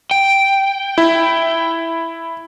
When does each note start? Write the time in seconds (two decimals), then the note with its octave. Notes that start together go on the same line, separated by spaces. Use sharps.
0.11 G5
0.98 E4